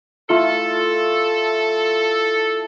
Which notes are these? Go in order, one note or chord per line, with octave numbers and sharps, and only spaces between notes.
A3 E4 F4 A4